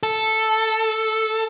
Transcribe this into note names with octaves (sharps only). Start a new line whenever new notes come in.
A4